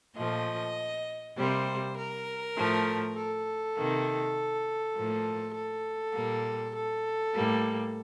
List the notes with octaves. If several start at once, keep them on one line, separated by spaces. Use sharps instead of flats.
A#2 F3 A3 D#5
C3 G3 A#3 C5
A#4
A2 F3 A3
A4
C3 D#3 A#3
A2 F3 A#3
A4
A#2 G3 A#3
A4
A2 G3 A#3